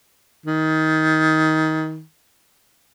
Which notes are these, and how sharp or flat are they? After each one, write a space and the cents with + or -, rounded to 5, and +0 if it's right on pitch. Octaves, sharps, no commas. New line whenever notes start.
D#3 +20